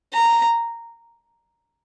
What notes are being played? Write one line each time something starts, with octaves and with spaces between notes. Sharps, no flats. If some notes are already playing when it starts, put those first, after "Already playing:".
A#5